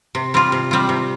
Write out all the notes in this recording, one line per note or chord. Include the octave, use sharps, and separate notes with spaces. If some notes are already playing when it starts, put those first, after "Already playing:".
C3
G3 C4 F4
C3
G3 C4 F4
C3